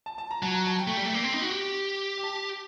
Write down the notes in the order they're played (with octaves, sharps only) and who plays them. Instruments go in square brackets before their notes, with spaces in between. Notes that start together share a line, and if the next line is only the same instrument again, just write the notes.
[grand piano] A5
A5
A#5
[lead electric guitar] F#3 [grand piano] A5
[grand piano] A#5
A5
G5
[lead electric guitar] A3
[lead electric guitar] G3 [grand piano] G5
[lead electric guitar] A3
A#3
C4
D#4
F#4
G4
[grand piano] G5
A5